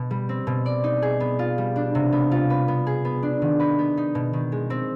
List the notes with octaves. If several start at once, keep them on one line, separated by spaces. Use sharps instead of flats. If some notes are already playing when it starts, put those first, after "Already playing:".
Already playing: B2
G3
C4
B2
D5
D#4
G#4
B3
F4
G3
D4
C3
B3
F4
B4
B3
G#4
B3
D4
D#3
B4
B3
D#4
B2
D#3
G#3
C4